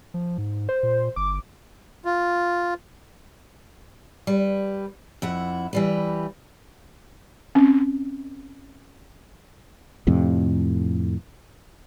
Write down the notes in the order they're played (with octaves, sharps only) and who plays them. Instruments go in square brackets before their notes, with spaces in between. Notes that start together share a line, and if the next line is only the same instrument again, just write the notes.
[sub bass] F3
G#2
[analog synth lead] C5
[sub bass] A#2
[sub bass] G1 [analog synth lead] D6
[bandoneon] F4
[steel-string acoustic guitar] G3 B4
F2 E4 F#5
E3 G3 B4
[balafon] C4 C#4
[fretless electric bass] F2 A2 C3